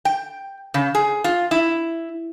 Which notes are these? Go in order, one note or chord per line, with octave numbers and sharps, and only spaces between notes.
G5
C#3
G#4
F4
E4